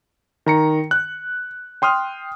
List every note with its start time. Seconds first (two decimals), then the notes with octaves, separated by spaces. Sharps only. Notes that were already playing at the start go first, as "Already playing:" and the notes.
0.46 D#3 A#5 C#7
0.91 F#6
1.82 G5 C6 D#6 F6